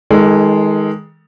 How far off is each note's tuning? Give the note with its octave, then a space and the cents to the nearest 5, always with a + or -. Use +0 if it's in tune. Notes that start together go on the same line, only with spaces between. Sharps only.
D#3 +35 G#3 +0 A4 +20